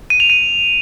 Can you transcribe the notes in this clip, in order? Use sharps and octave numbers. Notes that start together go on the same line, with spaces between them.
D#7
F7
D#7